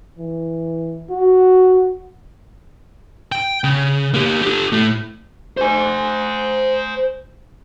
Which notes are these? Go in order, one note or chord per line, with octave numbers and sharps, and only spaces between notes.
E3
F#4
G5
C#3
A#3 G4
G4 A4
A2 A3
C5 G#5